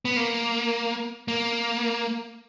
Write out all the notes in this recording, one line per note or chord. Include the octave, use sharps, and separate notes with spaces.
B3
A#3
A#3